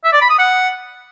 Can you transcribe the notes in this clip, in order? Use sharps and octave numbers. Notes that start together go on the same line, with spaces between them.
E5
D5
B5
D#6
F#5